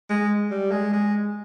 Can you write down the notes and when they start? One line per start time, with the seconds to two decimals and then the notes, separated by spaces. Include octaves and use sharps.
0.10 G#3
0.51 G3
0.72 G#3
0.93 G#3